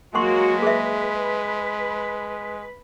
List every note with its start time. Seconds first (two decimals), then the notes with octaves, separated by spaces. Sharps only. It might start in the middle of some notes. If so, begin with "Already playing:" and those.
0.15 F#3 G#3 A#3 F#4 F#5 C6 C#6
0.62 G#4 B4 E5